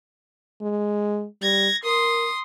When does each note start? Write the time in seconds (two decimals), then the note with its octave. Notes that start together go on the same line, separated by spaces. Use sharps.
0.61 G#3
1.42 G3 G#6 A#6
1.84 A#4 C6 D#6